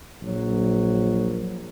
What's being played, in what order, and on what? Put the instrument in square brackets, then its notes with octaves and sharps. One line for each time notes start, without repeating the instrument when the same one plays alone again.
[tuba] A#1 [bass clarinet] F#3